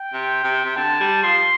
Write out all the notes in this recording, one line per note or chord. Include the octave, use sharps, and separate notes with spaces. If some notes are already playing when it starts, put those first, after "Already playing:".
Already playing: G5
C3
C3
C3
D3 A5
G3
F3 C6